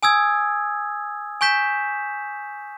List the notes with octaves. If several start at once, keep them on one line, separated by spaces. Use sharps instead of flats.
G#5 D#6 E6 G#6
G#5 C#6 G6 B6 E7